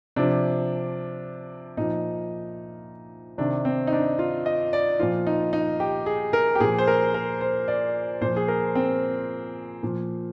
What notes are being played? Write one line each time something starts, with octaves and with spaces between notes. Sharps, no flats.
C3 F3 D4
A#2 F3 D#4
C3 D#3 D4
C4
D#4
D4
F4
D#5
D5
A#2 F3 F4
D#4
D#4
G4
G#4
A#4
G4
A#2 F3 G#4
C5
A#4
A#4
C5
D5
A#2 F3 C5
G#4
A#4
C4
A#2 F3